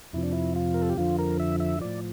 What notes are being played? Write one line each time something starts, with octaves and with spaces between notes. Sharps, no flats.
F2 C3 F3 E4
D4
E4
F4
A#4
A4
G4
F2 D3 F3 F4
A#4
E5
E5
A2 F3 D5